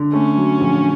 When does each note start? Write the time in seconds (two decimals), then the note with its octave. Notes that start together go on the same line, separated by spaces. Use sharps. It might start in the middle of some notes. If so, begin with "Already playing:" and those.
Already playing: D3
0.13 A3 C#4
0.37 F#3
0.61 A#1